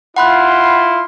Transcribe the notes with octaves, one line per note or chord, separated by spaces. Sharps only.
E4 F4 F#5 B5 C6 F#6